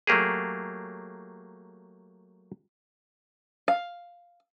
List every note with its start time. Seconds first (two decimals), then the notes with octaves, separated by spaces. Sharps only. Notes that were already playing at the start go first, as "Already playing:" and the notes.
0.07 F#3 A3 A#3 G4 G#4
3.68 F5